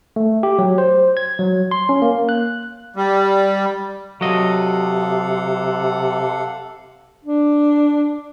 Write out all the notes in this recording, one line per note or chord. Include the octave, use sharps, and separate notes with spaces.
A3
G4
F#3
C5
G#6
F#3
C6
C#4
A#3
F#6
G3
C3 F#3 A4 D#5 F5 F#5
D4